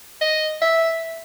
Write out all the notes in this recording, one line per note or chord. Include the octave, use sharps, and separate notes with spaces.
D#5
E5